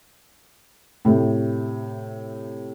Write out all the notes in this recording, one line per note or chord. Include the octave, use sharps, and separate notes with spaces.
A2 C3